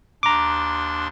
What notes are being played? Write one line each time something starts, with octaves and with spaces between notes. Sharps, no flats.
D#2 D4 A#5 C6 D6